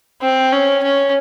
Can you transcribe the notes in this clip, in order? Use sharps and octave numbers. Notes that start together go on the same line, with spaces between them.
C4
C#4
C#4